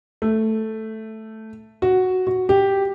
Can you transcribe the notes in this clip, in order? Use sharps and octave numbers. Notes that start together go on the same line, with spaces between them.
A3
F#4
F#4
G4